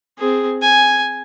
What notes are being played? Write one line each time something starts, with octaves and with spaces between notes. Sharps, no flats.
C4 G#4
G#5